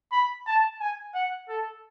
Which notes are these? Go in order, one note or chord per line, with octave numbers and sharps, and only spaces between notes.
B5
A5
G#5
F#5
A4